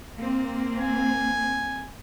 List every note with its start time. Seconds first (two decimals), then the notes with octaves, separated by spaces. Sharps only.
0.16 A#3 C4
0.79 G#5